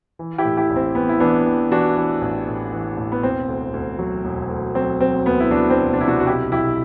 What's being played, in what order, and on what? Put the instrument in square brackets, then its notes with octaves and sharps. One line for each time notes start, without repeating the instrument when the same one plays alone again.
[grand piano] E3
E4 G4
A2
E4 G4
A1
C4
E3 B3
E4
E3 B3 D4
E3
E3 D4 F#4
E3
A1
A2
E3
A1
B3
E1 C4
D2
D2
F#3
E1
D2
F#3 C4
F#3 C4
D2 B3
E4
F#3 D4 F#4
C4
E1
D4
C3 E4
D4 F#4
F#4
B1 E4 G4
B1 E4 G4